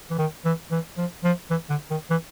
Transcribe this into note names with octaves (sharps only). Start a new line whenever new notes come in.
E3
D#3
E3
E3
F3
F3
E3
D3
D#3
E3